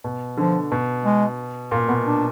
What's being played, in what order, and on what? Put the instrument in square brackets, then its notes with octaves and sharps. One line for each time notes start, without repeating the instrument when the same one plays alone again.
[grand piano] B2
[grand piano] D3 [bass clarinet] F3
[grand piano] B2
[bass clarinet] G#3
[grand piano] A#2 [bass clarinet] A#3
[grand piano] B2 [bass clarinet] B3
[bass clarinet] D4